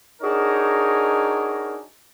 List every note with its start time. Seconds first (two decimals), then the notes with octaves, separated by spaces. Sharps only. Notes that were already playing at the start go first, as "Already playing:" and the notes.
0.22 D4 D#4 F#4 G#4 A#4 C#5